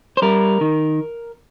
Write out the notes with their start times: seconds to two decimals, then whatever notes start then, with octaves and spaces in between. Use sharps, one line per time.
0.17 C5
0.22 G3 A#4
0.61 D#3